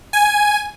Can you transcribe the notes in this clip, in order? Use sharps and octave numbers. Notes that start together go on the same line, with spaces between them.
G#5